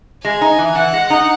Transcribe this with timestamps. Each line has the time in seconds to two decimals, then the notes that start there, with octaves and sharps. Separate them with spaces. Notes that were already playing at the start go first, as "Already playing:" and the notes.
0.24 G#3 G#5
0.41 D#4
0.58 E3
0.75 E3 F#5
0.93 G#3
1.10 D#4